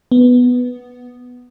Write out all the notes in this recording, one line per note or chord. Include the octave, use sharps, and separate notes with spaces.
B3